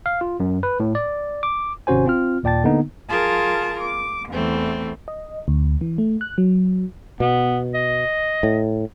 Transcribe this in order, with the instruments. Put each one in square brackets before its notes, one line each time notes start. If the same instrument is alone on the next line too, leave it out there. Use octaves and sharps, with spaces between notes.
[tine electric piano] F5
F4
F#2
B4
A2
D5
D6
G#1 C3 C#4 F#4 C5 G#5
C4 F4 F6
D#2 A#2 D5 G5 A5 A6
D3 A#3 B3 D#4
[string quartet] F4 G#4 A#4 A5
D6
E2 E3 A3 C4
[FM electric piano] D#5
D2
E3
A3
F#6
F#3
[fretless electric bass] B2 [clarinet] B3
[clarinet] D#5
[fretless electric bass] A2